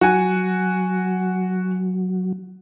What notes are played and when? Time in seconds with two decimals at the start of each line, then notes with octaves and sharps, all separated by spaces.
0.01 F#3 F#4 G#5